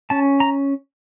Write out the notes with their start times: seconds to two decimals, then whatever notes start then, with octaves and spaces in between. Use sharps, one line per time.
0.10 C#4 A5
0.40 A#5